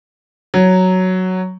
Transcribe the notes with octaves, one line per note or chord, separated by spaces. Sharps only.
F#3